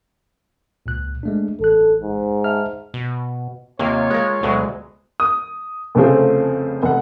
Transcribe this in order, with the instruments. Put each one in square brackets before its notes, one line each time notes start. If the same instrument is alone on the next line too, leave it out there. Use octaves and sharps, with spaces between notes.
[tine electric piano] C#2 A#2 F#6
G#3 A3 D4
[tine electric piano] A1 F#6 [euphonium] A4
[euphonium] G#2
[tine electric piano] E5 A5 F6
[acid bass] B2
[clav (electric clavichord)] D#2 C3 [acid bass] A#3 [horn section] F4 C#5
[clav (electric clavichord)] G#3 A#4
[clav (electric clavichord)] D2 B2 F#3 [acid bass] G#3
[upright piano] D#6
F1 C#3 F3 A3 C4 G#4
F1 F#5